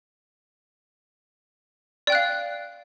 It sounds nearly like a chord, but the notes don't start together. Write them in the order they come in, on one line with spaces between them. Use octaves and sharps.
D5 G5 F#6 F5